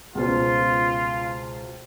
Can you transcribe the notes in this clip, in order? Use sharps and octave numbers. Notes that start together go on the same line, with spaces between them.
C#2 B2 F4 C5